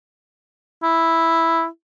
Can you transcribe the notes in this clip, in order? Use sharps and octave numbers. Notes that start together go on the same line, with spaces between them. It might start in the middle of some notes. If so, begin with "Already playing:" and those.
E4